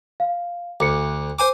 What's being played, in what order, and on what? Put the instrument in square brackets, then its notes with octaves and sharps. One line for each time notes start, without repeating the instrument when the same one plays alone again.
[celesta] F5
[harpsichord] D2 [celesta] D6 C#7
[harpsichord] C5 G#5 D6